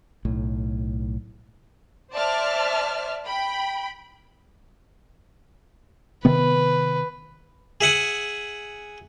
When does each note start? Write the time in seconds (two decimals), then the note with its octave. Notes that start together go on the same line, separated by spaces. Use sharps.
0.25 B1 A2
2.13 C5 D5 E5 A5 F6
3.26 G5 B5
6.25 C3 D#3 B3 B4
7.81 G#4 E5 F#5 G#5